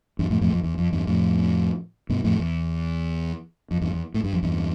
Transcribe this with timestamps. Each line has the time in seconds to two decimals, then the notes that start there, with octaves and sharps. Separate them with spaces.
0.19 E2 G2
0.30 F2 A2
0.41 F2 A2
0.53 F2
0.63 E2
0.78 F2
0.92 E2 G2
1.07 F2 A2
2.09 G2 B2
2.24 F2 A2
2.39 E2
3.71 F2
3.81 E2 G2
3.93 E2
4.14 A2
4.24 G2
4.33 F2
4.43 E2 G2